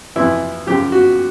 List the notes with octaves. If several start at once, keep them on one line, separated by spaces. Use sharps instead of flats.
F2 C3 E3 E4
F#2 C#3 F3 G4
F#4